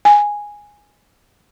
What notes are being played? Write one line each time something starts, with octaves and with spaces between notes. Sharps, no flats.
G#5